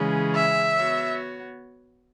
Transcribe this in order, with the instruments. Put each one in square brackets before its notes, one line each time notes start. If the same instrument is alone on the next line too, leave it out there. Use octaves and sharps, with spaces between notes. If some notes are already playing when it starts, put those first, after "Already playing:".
Already playing: [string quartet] C#3 E3 G#3 C#4 G#4
[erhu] E5
[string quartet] B3 F#4 C#5